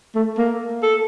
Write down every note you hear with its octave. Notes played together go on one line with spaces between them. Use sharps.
A3
A#3
A4